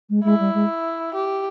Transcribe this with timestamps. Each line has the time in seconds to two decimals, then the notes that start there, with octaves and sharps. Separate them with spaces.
0.09 G#3
0.23 G#3 E4
0.39 G3
0.54 G#3
1.14 G4